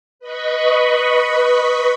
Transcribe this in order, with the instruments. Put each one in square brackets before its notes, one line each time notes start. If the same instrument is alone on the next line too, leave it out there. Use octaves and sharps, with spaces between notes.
[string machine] B4 D#5 B5 C#6